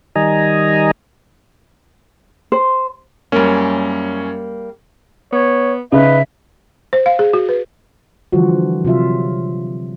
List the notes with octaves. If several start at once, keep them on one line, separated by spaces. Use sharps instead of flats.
D#3 G3 D#5 G#5 A#5
C5
F#2 G3 A#3 C#4
B3 C#5
C#3 D#4 B4 E5
C5
F5
G#4
F#4
B4
D3 E3 F3 G3 F4 F#4
C3 F#3 F4 E5